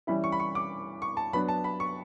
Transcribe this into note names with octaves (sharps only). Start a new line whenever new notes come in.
E3 G3 C#4 E4 B5
C#6
B5
C#6
D6
C#6
A5
F#3 B3 D4 B5
A5
B5
C#6